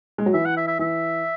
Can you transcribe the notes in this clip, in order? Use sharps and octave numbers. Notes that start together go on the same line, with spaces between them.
G#3
F#3
E3 E5
F#5
E5
E5
E3 E5